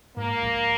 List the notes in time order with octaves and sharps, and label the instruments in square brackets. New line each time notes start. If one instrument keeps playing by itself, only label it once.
[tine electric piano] G#2 [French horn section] A#3
[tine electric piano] A#1